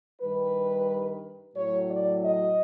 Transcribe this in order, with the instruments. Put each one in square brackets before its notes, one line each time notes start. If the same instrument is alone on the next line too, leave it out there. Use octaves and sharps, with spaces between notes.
[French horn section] G2 D#3 G3 B4
A2 F#3 C#5
D5
D#5